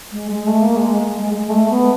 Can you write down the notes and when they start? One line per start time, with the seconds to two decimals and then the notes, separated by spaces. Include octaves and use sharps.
0.12 G#3
0.31 G#3
0.47 A3
0.62 A#3
0.76 G#3
1.06 G#3
1.20 G#3
1.35 G#3
1.50 A3
1.70 B3